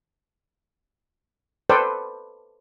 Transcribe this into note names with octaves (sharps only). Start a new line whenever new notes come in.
A4 B4 C5 D5 G5